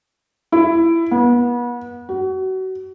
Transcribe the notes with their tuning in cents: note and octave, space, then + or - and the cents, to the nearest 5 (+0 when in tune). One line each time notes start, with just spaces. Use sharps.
E4 +15
B3 -35
F#4 +30